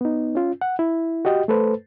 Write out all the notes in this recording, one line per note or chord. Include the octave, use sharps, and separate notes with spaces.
B3 D#4
C#4 F4
F#5
E4
F#4 G4 D#5 G5
A3 A4 B4 C5